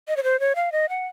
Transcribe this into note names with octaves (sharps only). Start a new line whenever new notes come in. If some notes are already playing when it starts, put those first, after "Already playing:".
D#5
C#5
C5
C#5
F5
D#5
F#5